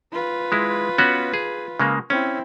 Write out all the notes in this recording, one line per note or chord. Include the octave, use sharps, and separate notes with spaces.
F4 B4
G#3 E4
B3 C#4 F#4
G#4
C#3 G#3 A#3
C4 C#4 E4